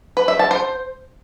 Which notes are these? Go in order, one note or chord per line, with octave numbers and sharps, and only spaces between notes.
B4
E5
A5
C5